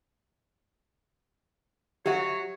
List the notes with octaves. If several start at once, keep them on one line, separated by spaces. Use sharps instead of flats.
F#3 F#4 G4 C#5 E5